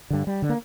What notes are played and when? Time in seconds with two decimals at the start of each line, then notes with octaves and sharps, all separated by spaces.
0.10 G2 D3
0.27 G3
0.42 D3
0.49 A#3